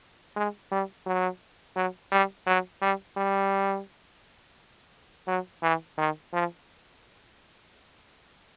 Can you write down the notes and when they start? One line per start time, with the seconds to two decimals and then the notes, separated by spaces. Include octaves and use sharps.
0.36 G#3
0.71 G3
1.06 F#3
1.76 F#3
2.12 G3
2.47 F#3
2.81 G3
3.17 G3
5.27 F#3
5.63 E3
5.98 D#3
6.33 F3